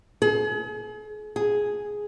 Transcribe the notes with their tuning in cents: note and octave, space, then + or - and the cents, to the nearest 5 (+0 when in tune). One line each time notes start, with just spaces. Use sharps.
G#4 +40
G#4 +0